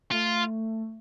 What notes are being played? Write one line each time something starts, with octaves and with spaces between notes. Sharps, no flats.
A3 F4